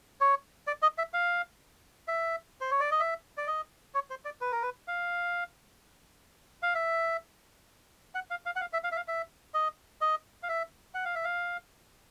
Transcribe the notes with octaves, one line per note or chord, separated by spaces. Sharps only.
C#5
D5
D#5
E5
F5
E5
C5
C#5
D5
D#5
E5
D5
D#5
C#5
C5
D5
B4
A#4
B4
F5
F5
E5
F#5
F5
F5
F#5
F5
E5
F5
E5
F5
E5
D#5
D#5
F5
E5
F#5
F5
E5
F5